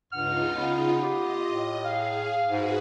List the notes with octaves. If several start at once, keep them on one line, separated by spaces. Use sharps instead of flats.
C#2 G2 C#3 D#4 F4 F#5 F6
B3
F4 G4 D#5
A2
G#4 F5
G#2 F#4 G#4 B4